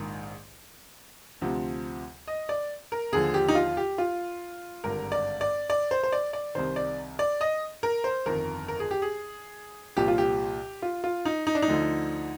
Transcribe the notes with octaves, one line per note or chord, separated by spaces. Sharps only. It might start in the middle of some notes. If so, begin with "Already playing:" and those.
Already playing: A#1 G#2 D#3
D2 C3 F3
D#5
D5
A#4
D#2 D3 F3 G#4
G4
D#4
F4
G4
F4
G#1 G2 D3 A#4
D5
D5
D5
C5
C5
D5
D5
C2 C3 D#3 C5
D5
D5
D#5
A#4
C5
G1 F2 D#3 A#4
A#4
G#4
G4
G#4
C2 A#2 F3 G4
F4
G4
F4
F4
D#4
D#4
D4
D#4
D2 D3 F3